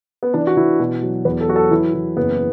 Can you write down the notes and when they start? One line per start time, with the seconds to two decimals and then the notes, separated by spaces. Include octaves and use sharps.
0.23 B3
0.34 E3 D4
0.47 F#4
0.57 E3 E4
0.80 B2
1.02 F#3
1.25 E2 B4
1.41 A4
1.48 F#3 F#4
1.56 A4
1.71 E3 E4
1.94 E3
2.16 F#1 B3